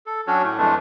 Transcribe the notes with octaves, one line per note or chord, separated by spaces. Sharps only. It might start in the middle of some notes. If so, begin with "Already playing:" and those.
A4
F#3 C#4 D4 F#4 C#5
A2 A3
F2 E3 G#3 A3 D4